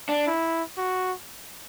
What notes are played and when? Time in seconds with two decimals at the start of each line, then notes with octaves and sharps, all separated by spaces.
0.09 D4
0.27 E4
0.77 F#4